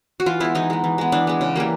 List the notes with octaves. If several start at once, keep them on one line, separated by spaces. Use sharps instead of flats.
F#4
E3 F4
G#3 B3 E4
E3 D#4
G#3 B3
E3
G#3 B3
E3 D4
G#3 B3
C#3
E3 G3 A#3